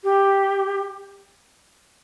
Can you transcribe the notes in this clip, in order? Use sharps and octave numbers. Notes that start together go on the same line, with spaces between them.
G4